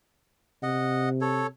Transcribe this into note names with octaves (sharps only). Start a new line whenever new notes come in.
C3 D#5 F#5
A4 C#5